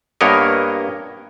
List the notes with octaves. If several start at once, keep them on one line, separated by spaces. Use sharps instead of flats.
G2 A#3 B3 A#4 C#5 D#5